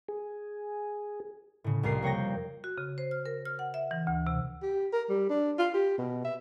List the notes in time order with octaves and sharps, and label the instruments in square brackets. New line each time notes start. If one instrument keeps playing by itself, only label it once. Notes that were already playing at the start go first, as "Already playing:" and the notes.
[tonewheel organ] G#4
[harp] A2 C#3
C2 F2 A#4 C7
A#3 C#5 G5 A#6
[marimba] F#4
C#3
C5
F6
A#4
F6
F#5
E5
E3
D2
C3
[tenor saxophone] G4
A#4
G3
D4
F4
G4
B2
E5